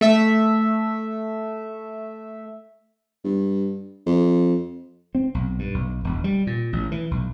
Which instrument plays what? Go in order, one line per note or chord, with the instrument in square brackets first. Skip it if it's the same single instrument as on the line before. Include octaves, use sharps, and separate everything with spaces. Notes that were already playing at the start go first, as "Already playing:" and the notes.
[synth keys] A3 E5
[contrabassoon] G2
F2
[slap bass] C4
B1
G2
B1
E1
G3
A#2
A1
E3
B1